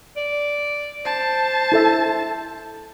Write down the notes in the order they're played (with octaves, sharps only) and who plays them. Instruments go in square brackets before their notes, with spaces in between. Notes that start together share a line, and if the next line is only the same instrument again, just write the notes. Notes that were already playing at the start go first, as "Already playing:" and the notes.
[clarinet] D5
[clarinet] C5 [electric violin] A5
[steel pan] E4 A4 E5